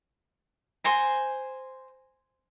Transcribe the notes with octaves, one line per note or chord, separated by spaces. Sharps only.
C5 G#5 A#5